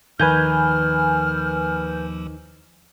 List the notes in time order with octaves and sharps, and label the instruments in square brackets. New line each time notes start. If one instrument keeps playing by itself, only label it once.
[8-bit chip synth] D#2 F3 [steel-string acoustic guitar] D#3 [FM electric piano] B4 G#5 G6 [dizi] F6